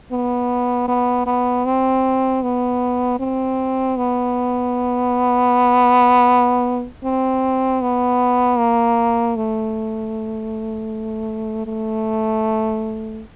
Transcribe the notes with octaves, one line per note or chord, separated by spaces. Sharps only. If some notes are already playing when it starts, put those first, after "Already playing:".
B3
B3
B3
C4
B3
C4
B3
C4
B3
A#3
A3
A3